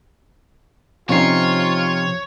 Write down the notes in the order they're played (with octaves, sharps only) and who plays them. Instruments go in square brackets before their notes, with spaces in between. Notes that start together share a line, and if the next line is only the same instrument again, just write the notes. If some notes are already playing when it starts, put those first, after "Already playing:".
[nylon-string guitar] C3 C#4 D#4 [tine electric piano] F3 C7 [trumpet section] F4 [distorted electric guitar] C#5